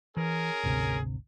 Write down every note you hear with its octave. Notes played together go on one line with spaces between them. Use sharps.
E3 C#4 G#4 A#4
G#1 D2 C3